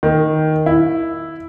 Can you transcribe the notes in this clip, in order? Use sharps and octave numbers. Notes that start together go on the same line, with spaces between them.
D#3
E4